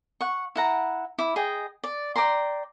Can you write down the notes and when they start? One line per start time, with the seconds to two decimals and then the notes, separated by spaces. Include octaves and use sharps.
0.21 F#5 C#6
0.56 E4 F#5 A#5
1.19 E4 D6
1.36 G#4 D#5 G5
1.84 D5
2.16 D5 G5 A#5 C6